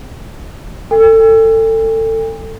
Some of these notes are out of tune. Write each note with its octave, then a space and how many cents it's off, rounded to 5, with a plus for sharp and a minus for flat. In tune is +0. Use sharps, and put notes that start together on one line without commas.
A4 +25 G5 +45